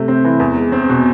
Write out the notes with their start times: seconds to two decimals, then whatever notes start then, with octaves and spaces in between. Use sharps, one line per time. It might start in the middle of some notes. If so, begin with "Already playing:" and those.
Already playing: C3 A3
0.08 C4
0.25 E3
0.40 E2
0.57 G#3
0.72 C4
0.89 B2